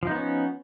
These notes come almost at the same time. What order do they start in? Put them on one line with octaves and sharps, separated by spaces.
F3 D#4 B3 C#4